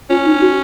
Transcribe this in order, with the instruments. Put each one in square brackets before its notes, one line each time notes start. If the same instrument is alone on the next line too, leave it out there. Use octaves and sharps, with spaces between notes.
[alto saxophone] C#4 [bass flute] F4
[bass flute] D#4
F#4